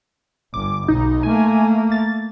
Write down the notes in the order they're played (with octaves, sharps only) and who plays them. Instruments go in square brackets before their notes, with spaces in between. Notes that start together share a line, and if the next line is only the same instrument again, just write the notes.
[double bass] G1 [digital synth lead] D6
[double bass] B1 [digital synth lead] D#4
[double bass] A3 A#3 [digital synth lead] G#5
[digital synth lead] A6